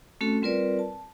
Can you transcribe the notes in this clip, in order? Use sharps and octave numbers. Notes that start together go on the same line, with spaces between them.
A3 C4 C#4 F#4 A4
G3 C4 F4 A#4 B4 D5
A5